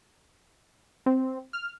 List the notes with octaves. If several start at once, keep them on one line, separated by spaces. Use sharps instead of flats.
C4
F6